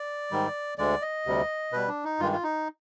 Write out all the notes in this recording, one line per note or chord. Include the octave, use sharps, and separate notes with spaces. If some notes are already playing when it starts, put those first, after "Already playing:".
Already playing: D5
G#2 D#3 G3
D2 D3 G#3 D5
D#5
D2 C3 G3
B2 G3 B4
D4
D#4
G2 D#3 G#3 F4
F4
D#4